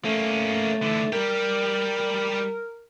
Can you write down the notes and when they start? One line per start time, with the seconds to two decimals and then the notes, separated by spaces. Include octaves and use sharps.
0.05 A3 A#3 C#4
0.82 D3 E3
1.13 G3 G4 A#4